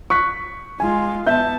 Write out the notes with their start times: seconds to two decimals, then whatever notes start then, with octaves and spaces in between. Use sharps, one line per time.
0.10 C#6 F#6 B6
0.80 G#3 F4 G#5
1.27 B3 E5 A5 G6